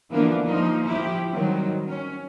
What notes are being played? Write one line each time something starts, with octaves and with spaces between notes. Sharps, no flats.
D3 E3 F3 A#3 B3 D4
F3 A#3 D#4
F3 E4 G4
D#3 F#3 G3 C4
C#4